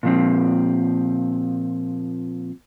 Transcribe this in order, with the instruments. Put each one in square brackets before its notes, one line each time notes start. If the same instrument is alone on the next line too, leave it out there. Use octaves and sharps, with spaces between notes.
[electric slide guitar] A#2 F3 C4